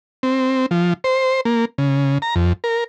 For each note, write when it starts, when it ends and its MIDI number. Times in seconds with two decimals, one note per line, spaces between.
0.23 0.66 60
0.71 0.93 53
1.04 1.41 72
1.45 1.65 58
1.78 2.18 49
2.22 2.35 82
2.35 2.53 41
2.64 2.84 70